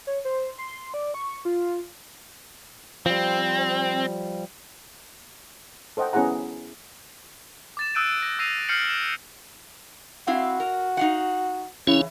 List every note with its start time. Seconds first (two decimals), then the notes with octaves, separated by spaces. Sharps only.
0.07 C#5
0.25 C5
0.58 C6
0.94 D5
1.14 C#6
1.45 F4
3.06 F3 G3 C4
5.97 A4 C5 D#5 F#5 G5
6.13 B3 C#4 E4 G#4 F#5 A#5
7.77 D6 A6 E7
7.95 D#6 E6 F#6 G6 D7 D#7
8.23 A#6
8.39 E6 A#6 C7 D#7 F7
8.69 F6 G6 C7 C#7 F#7
8.87 D7 E7
10.27 C4 E4 F#4 F5
10.60 A#4
10.97 D#4 F5 F#5
11.87 C#3 E3 C#4 E4